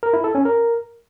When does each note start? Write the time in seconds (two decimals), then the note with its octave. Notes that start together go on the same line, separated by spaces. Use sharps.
0.03 A#4
0.13 E4
0.24 A4
0.35 C#4
0.45 A#4